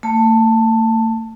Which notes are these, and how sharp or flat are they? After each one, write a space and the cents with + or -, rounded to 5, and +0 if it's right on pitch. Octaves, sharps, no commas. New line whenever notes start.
A3 +45 A5 +10